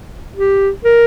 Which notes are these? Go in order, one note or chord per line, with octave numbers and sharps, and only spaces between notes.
G4
A#4